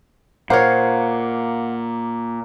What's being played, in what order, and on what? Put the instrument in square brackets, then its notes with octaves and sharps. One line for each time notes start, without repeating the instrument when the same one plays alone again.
[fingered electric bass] A#2 [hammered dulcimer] A#4 D6 [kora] C5 C#5 [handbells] F5 F#5